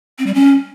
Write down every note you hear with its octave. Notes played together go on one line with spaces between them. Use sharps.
C4
G3
C#4